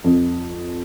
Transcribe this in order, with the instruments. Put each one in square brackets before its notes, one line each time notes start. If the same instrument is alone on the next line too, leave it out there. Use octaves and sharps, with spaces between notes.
[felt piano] F2